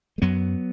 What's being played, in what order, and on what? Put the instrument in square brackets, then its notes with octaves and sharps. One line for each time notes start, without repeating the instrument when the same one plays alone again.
[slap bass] G#3
F#2 F#3 B3